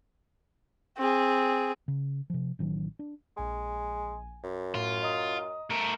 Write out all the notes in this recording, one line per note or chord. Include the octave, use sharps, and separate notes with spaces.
C4 G#4
C#3
C3 F3
A1 D#3 F#3
D4
A#1 G#3 G#5
F#2
A2 F4
D#5 A#5 D#6
A3 A#4 E7